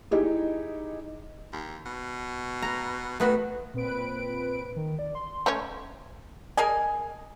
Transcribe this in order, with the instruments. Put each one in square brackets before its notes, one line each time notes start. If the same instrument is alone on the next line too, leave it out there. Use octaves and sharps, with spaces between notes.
[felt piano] D#4 E4 G4 G#4
[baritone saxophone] D#2
B2
[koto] A#5
[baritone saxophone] D#3 [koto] A3 B3 F#4
[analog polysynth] A#2 C4 B4 D7
[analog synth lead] D#3
D5
C6
[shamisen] A3 C#4 C#5
[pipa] G#4 A#4 D#5 G#5